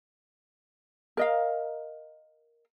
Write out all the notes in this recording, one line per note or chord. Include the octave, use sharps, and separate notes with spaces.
A#4 D#5 F5